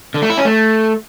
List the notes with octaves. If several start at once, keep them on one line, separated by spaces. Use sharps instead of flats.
D3
A3
E4
C#4
A3